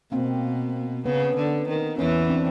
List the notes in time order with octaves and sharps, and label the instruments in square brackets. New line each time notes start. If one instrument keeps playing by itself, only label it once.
[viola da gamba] B2 [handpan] A#3 C4
[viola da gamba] C#3 [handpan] B3 C#4
[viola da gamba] D3
D#3
[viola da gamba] E2 E3 [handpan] B3 C#4
[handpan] C4 D4